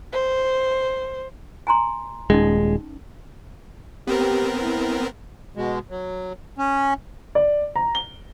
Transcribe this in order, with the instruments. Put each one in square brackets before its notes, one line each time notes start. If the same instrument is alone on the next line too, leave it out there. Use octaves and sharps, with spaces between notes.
[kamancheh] C5
[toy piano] G#5 A#5 C6
[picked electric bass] D#1 G#3 [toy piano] C#4 D#4
[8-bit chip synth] B3 C4 A#4 [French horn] G4
[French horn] E4
[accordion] B2 G#3
F#3
C#4
[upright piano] D5
A#5
G7